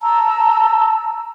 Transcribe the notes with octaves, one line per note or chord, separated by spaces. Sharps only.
A5 A#5 E6